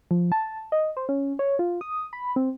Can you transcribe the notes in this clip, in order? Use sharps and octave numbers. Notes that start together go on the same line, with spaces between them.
F3
A5
D#5
C5
C#4
C#5
F4
D#6
B5
C4